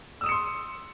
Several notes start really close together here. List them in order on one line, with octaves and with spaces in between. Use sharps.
E6 D#6 E7 C#7 C6